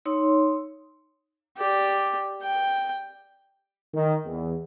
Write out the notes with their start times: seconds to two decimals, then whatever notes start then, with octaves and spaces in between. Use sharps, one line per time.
0.05 D#4 C#5 C6 E6
1.57 G4 D5
2.42 G5
3.94 D#3
4.25 E2